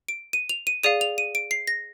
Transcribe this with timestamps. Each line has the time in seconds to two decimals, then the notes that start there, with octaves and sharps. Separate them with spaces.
0.08 D7
0.33 D#7
0.49 F7
0.67 D#7
0.83 G#4 D5 F5 D#7
1.01 F7
1.18 D#7
1.35 D7
1.51 C7
1.67 A#6